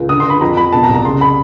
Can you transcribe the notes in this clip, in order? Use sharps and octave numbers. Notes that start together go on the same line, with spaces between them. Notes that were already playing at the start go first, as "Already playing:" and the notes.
Already playing: C#2
D3 D#6
C6
D3 B5
F2 A#5
F2 B5
B2 A5
A#5
C2
A#5
C#3 C6
B5